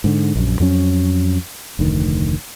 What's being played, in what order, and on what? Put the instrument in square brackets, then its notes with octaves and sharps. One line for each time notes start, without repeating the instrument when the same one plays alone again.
[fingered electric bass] G#2 D3
A#1 F#2
F2 F#3 C#4
F1 D2 D#3